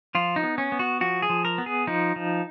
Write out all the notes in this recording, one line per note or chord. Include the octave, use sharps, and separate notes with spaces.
F3 F4
D#4
B3
C#4
B3
F#4
F3 F#4
G#4
F3
A#4
B3
G#4
F3 D#4
F3